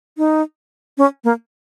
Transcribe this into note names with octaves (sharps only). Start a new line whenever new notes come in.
D#4
C#4
A#3